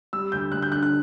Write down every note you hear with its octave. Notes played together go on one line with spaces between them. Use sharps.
G3 E6
D2 G6
D2 F#6
G6
D3 F#6
F#6